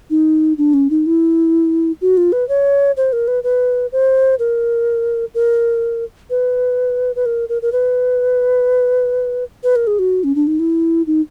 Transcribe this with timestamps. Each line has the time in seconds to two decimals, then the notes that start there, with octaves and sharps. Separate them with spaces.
0.10 D#4
0.58 D4
0.74 C#4
0.90 D#4
1.06 E4
2.01 F#4
2.17 F4
2.32 B4
2.49 C#5
2.97 C5
3.13 A#4
3.28 B4
3.44 B4
3.92 C5
4.39 A#4
5.35 A#4
6.30 B4
7.16 B4
7.26 A#4
7.49 A#4
7.62 A#4
7.72 B4
9.63 B4
9.76 A#4
9.87 G#4
9.99 F#4
10.24 C#4
10.35 D4
10.47 D#4
10.59 E4
11.07 D#4